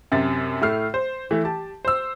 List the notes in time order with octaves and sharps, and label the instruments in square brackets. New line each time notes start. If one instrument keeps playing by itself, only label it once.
[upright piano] F#2 C3 A6
A2 A3 F6 C7
C5
E3 A3
G4 A5
C5 E6